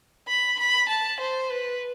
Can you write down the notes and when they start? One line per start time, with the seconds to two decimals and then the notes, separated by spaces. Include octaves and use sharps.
0.28 B5
0.59 B5
0.89 A5
1.20 C5
1.51 B4